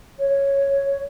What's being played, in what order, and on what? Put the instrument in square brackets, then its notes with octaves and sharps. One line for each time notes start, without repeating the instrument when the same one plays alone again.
[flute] C#5